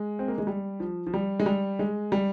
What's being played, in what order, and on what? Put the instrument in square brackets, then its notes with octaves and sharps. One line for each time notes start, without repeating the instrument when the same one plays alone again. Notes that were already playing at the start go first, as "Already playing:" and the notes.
Already playing: [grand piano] G#3
C4
A#3
G#3
G3
F3
F3
G3
G#3
G3
G#3
G3